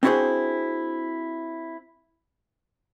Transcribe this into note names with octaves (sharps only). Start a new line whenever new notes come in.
C4 D4 E4 F#4 G#4 C5